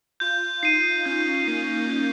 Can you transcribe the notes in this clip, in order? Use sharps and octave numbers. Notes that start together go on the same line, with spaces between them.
F4 G6
D#4 C7 D#7
C#4 G6
A#3 C7 D#7
G6